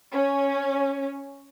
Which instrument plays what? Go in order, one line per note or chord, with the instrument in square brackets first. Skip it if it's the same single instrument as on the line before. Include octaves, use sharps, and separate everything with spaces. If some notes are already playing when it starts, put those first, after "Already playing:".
[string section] C#4